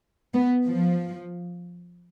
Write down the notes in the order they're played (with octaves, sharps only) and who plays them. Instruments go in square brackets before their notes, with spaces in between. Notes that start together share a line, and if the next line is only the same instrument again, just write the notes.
[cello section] B3
F3